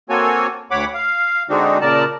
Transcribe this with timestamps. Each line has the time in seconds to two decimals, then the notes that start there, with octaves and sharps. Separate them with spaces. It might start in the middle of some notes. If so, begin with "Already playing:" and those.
0.10 A#3 C4 F#4 A4 C#5 G#5
0.71 D2 C#5 F#5 B5 D6
0.94 F5
1.50 D3 G#3 C4 D4 D#4 F#4
1.81 A#2 C#3 A#4 D5 A5